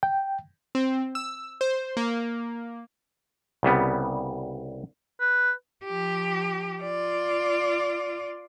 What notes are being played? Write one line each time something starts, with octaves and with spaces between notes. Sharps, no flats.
G5
C4
E6
C5
A#3
C2 C#3 G3 B3
B4
F3 G4
F4 D5